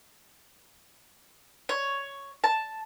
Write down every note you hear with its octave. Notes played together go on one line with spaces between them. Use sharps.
C#5
A5